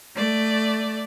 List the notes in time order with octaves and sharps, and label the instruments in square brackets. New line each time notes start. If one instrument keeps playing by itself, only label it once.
[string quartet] A3 D5